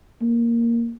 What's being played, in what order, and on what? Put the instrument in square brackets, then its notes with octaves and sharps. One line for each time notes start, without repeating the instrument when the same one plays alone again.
[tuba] A#3